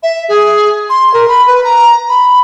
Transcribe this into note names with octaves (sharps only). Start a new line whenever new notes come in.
E5
G#4
C6
A#4
B5
B4
A#5
B5